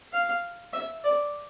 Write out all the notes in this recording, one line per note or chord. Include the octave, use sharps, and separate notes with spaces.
F5
E5
D5